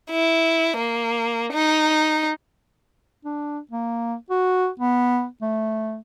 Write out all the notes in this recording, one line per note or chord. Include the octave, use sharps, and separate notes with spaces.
E4
A#3
D#4
D4
A#3
F#4
B3
A3